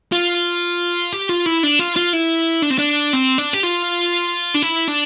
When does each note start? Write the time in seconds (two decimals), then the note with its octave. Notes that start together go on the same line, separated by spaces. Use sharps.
0.12 F4
1.13 G4
1.29 F4
1.46 E4
1.63 D4
1.79 F4
1.96 F4
2.13 E4
2.63 D4
2.70 C4
2.78 D4
3.13 C4
3.38 D4
3.54 G4
3.64 F4
4.55 D4
4.63 E4
4.88 D4